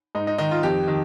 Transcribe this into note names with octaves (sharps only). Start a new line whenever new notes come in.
G#2 D#4
D#4
D#3 D#4
F4
F2 G4
D#3